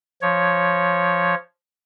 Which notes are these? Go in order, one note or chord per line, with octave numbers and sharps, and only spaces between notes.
F3 C#5